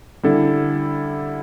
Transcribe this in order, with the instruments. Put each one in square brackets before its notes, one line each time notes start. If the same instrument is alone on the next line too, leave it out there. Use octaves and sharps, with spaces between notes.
[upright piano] D3 [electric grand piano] G3 E4 A4